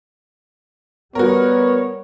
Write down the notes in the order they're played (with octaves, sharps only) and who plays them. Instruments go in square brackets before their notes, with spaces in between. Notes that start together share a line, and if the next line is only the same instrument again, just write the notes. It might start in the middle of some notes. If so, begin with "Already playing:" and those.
[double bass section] G3 [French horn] B3 [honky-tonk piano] F#4 A#4 [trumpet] C#5